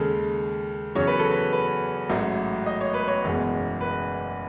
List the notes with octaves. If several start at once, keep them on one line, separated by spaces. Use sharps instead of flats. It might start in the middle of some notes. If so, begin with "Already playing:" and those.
Already playing: D#2 C#3 G#3 A4
E2 C#3 F#3 C#5
B4
A4
B4
B4
A1 G#2 F#3 A3
D#5
C#5
B4
C#5
F#1 E2 B2 G#3
B4